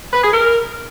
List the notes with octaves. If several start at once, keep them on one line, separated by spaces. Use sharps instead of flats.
B4
G#4
A#4